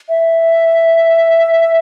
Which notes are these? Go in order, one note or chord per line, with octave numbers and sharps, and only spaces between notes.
E5